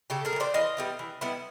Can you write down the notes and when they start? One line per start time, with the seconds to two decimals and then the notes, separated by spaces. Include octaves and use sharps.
0.10 C#3 G4 A4
0.25 G#4 A#4
0.33 G3
0.36 E3 C5 D5
0.54 E3 D#5 F5
0.77 G3 B3 E4
0.99 E3
1.21 G3 B3 E4